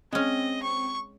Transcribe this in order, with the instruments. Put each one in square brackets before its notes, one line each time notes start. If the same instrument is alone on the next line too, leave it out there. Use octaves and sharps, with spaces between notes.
[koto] G#3 C#4 [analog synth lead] C4 [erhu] D#5
[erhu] C#6